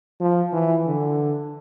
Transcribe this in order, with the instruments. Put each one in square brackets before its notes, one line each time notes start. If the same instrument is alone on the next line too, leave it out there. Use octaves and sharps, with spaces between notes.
[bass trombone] F3
E3
D3